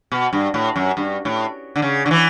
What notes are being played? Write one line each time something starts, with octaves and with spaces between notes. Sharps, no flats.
B2
G2
A2
F#2
G2
A2
D3
C#3
D3
E3